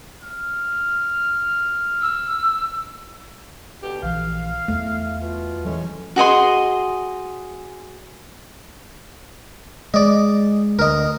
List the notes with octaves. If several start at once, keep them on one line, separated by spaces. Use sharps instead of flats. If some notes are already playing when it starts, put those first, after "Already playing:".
F6
E6
B2 D3 G4
A#1 E3 F5
E2 A3
B2 F4
E3 F#3 G#3 A3 C#4
F#4 G#4 D#5 C6
G#3 D5 D#5
D2 A#4 D#5